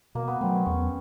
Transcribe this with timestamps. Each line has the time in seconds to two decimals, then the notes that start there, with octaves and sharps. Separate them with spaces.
0.15 B2 A#3
0.28 B3
0.41 F#3 A3 C4
0.54 C#4
0.66 E2 C#4